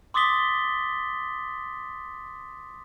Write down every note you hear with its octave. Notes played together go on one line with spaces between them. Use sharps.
C6 D6 D#6 A6 B6 G7